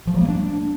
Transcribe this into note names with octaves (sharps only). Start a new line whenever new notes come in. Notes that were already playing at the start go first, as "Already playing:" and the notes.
F3
G3
A#3
D4